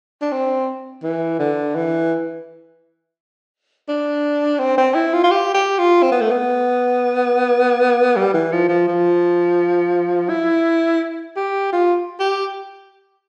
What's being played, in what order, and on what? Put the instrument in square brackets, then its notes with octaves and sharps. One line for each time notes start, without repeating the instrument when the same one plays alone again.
[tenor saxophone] D4
C4
E3
D3
E3
D4
C4
C4
E4
F4
F4
G4
G4
F4
C4
B3
A3
B3
G3
E3
F3
F3
F3
E4
G4
F4
G4